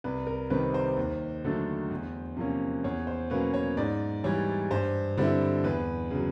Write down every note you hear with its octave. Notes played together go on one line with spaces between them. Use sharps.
C2 B4
A#4
C3 D#3 G3 C4 B4
C5
D#2
D3 F#3 A3 D4
E2
C3 F3 A#3 C#4
E2 C#5
C5
B2 F#3 A#3 C#4 B4
C#5
G#2 D5
E3 G3 C#5
G2 C5
D3 G3 C4 E4
E2 B4
C#3 F#3